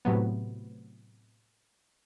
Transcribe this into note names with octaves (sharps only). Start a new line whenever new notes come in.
A2 C3 F#3 B3